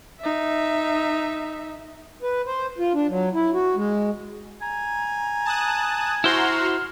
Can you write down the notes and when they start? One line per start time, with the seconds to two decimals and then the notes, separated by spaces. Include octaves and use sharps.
0.20 D#4 E5
2.22 B4
2.47 C5
2.78 F4
2.94 D4
3.08 F#3
3.34 E4
3.54 F#4
3.76 G#3
4.62 G#5 A#5
5.45 A5 D#6 F#6
6.24 E4 F#4 C5 A#5 C6 F6